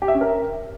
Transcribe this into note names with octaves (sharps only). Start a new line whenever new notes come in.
G4
E5
C#4
A#4